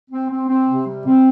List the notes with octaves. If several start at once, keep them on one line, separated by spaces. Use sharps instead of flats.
C4
C4
C4
C3
G3
C4